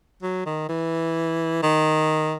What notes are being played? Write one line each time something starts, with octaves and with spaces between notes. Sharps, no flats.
F#3
D#3
E3
D#3